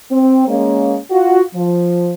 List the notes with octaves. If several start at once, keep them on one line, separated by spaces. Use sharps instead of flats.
C4
G#3 A#3 C#4
F4 F#4
F3